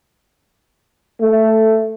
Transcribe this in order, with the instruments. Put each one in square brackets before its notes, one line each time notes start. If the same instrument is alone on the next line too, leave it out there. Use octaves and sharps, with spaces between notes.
[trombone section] A3